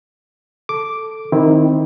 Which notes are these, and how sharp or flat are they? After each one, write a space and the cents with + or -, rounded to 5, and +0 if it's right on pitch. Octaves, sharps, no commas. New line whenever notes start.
A4 +0 D6 +0
D#3 +0 C4 +0 E4 -20